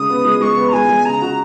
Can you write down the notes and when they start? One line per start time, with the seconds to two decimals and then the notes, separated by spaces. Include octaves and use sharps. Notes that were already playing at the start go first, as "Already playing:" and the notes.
Already playing: C#3 G#3 D#6
0.10 B3
0.25 G#3
0.41 G#3 C#6
0.57 B3
0.68 A#5
0.73 G#3 G#5
0.89 G#3
1.05 C#3 A#5
1.22 F#4